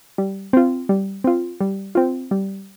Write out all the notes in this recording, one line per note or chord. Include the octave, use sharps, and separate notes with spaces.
G3
C4 F4
G3
C4 F4
G3
C4 F4
G3